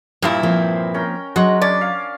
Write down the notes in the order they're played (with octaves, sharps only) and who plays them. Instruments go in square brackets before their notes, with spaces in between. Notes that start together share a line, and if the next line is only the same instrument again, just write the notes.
[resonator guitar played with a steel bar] G2 A#2 E4 [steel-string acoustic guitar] G3 [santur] A#5
[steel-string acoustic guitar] F3 A#3 C4
[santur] C#4 A#4 G5
[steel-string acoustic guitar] F#3 [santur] G#3 [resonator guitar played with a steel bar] F#4
[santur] C#4 D4 D6 [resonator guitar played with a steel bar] D5
[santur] F5